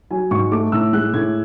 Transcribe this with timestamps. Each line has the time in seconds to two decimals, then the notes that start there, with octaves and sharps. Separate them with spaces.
0.11 F#3 G#5
0.31 G#2 C#6
0.51 A3 D6
0.72 A2 E6
0.93 G#3 F#6
1.13 A2 G#6